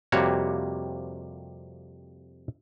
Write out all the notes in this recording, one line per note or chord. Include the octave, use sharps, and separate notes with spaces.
F2 C3 G3 A#3 F#4 C#5